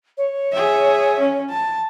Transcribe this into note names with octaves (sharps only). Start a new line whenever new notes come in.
C#5
G#4 E5
C#4
A5